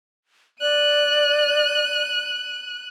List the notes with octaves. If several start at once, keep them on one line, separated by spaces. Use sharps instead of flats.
D5 F#6 D#7